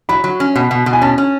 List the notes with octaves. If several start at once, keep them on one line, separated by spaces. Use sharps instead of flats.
F#3 B5
F#3
C#4
B2
B2
B2
G#5
C#4 A5
C#4